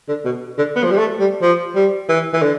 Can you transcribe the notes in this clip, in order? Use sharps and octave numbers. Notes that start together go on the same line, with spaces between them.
D3
B2
D3
B3
F3
G3
A3
G3
F3
G3
E3
E3
D3